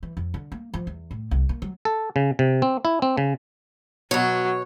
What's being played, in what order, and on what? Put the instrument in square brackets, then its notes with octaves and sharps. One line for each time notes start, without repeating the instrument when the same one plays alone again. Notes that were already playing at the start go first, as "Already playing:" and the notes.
[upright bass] E3
F2
D3
A#3
F3
E2
A2
C2
A#3
F#3
[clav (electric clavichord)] A4
C#3
C3
C4
E4
C4
C#3
[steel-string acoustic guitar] B2 C#5 [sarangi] F#3